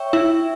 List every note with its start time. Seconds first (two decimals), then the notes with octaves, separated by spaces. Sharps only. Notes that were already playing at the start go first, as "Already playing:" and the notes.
Already playing: C#5 E5 G5 C#6
0.13 E4 E5